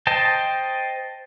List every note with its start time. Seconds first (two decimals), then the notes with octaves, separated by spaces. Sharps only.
0.07 C5 D#5 G5 A5